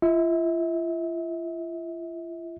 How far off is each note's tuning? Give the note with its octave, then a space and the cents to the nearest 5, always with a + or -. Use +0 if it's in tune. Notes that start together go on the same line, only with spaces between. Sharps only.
F4 -40 E5 -35